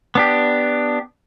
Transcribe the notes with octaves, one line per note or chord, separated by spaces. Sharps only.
B3 D4 G4